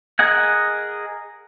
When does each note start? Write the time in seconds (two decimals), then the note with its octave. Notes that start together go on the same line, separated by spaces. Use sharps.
0.19 G#4 A#4 D#5 F#5 G#5